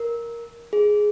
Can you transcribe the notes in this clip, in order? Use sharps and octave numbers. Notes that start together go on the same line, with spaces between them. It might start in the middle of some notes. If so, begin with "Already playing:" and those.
Already playing: A#4
G#4